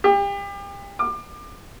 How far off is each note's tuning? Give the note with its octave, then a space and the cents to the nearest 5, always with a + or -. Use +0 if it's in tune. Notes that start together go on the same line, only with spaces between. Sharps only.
G4 +30
D6 +30